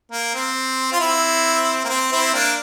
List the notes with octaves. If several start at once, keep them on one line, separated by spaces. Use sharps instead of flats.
A#3
C4
F4
C4 E4
A#3
C4
C4 E4
A#3 D4